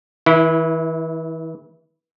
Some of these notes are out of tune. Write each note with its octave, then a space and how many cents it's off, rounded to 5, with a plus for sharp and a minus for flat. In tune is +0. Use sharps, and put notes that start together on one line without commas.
E3 -35 E4 +0